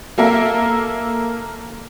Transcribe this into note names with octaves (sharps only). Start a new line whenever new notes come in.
A#3 A4 A#4 E5 F5